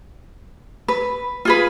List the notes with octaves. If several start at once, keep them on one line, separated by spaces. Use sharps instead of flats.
B4
F4 G#4 B4